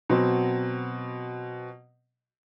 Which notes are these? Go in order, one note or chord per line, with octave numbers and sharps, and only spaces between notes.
B2 F#3 C4